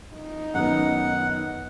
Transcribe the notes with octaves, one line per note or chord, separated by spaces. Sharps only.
D#4
F#2 D#3 B3 F#5